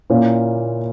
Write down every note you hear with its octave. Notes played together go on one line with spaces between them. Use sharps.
A#2 A#3 C#4 E4